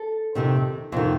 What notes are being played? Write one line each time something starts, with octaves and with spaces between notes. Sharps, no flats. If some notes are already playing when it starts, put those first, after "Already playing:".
Already playing: A4
F2 C3 D#3
F2 C3 D#3